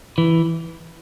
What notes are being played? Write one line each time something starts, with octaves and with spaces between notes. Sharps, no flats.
E3